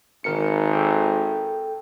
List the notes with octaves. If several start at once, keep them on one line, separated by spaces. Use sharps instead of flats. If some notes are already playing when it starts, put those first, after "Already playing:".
G#1 D#3 A#4 C#7
A4 G5